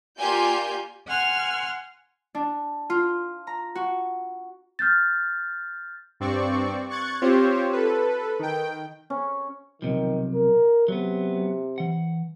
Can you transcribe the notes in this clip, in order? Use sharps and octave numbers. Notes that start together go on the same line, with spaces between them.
A#3 F4 G4 D5 G#5 G6
F#5 G#5 C6 F6
D4
F4
A#5
F#4
F6 G6 A6
G2 C4 D5 C#6
C#6 F#6 G#6 A6 C#7
C4 F4 G4 C5 C#5
A4 B4
D#3 G5
C#4
B1 C3 D#3 F3
A#4
C3 F#3 B3
E3 F#5